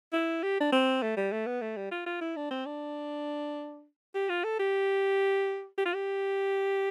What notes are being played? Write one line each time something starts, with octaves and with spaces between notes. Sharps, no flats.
E4
G4
D4
C4
A3
G3
A3
B3
A3
G3
F4
F4
E4
D4
C4
D4
G4
F4
A4
G4
G4
F4
G4